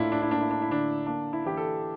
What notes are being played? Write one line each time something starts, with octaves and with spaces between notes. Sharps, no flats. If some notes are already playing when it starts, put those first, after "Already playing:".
Already playing: A2 A#3 D4 E4 F4
D4
E4
A#3 D4
E4
D4
E4
D3 D4
A#3 D4
E4
E3 G4
A4